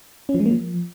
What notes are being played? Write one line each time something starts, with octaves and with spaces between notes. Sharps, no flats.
C#4
F3
G#3
A#3
F3